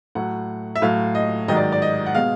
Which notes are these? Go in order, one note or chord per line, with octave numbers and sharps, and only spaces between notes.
A2 F#3 F#5
E5
A2 F#3 F5
D#5
G#2 D#3 F#3 D#5
D5
D5
D#5
F#5
B2 G#3 F5